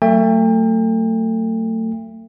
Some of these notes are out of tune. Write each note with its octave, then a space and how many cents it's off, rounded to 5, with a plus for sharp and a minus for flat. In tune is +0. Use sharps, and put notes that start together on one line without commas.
F#3 +5 A3 +30 G5 +35